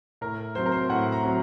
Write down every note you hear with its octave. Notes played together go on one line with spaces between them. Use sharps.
A2 A#4
F#3 C4 C5
A#4
C5
A2 F#5
A#5
F#3 C4